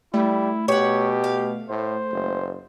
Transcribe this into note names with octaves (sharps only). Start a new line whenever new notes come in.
G3 A3 E4
B2 G4 C#5 F#5
F5
A2 C5
F#1